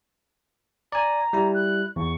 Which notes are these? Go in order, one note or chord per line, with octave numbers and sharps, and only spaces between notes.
D5 G#5 A#5
G3 E4
F#6
E2 C#6